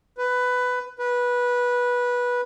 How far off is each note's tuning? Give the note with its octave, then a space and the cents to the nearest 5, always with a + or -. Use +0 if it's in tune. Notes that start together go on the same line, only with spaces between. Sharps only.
B4 +15
B4 -15